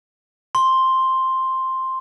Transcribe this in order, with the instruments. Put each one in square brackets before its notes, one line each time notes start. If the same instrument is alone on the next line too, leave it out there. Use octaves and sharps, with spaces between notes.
[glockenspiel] C6